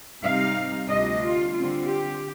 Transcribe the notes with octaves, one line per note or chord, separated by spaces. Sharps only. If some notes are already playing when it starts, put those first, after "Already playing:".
C3 G3 C4 D#4 F5
D2 C3 G3 D4 F4 D#5
F4
D3 G3 C4 F4
G4